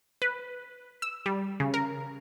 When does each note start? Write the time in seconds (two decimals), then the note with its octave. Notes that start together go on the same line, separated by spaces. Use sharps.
0.22 B4
1.02 E6
1.26 G3
1.60 C#3
1.74 A#4